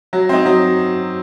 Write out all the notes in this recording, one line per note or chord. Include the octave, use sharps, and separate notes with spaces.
F#3
C4 D#4
F#3